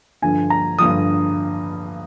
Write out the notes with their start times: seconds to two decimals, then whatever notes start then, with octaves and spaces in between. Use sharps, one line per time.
0.22 G2 D3 F3 G#5
0.50 A#5
0.79 G2 D3 F3 D#6